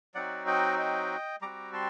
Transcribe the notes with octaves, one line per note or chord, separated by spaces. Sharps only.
F#3 C4 D#4 F#4 D5 F#5
D#5 G5
D#5 G5
G3 C4 F#4 A#5 D6
A5 C6